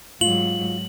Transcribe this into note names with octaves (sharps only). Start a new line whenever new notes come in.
G#2 F#3 F4 F#7